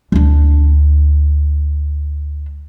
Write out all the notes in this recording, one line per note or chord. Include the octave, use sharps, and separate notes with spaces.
D2 D4